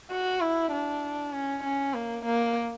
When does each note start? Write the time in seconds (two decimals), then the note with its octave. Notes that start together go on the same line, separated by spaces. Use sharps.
0.11 F#4
0.41 E4
0.72 D4
1.34 C#4
1.64 C#4
1.94 A#3
2.25 A#3